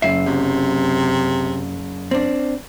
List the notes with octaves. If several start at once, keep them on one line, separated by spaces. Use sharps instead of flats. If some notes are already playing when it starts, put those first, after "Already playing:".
F#1 E5 C7
F#2 C3
C4 D4